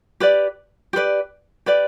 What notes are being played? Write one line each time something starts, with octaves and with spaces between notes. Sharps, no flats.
G4 B4 D5
G4 B4 D5
G4 B4 D5